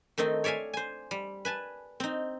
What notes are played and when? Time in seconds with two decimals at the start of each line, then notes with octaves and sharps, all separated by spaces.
0.18 D#3 A3 C4 D#4
0.44 C#5 D5 E5 F5 G#5
0.74 C5 G#5
1.11 G3
1.45 B4 G#5 A5
2.00 C4 D#4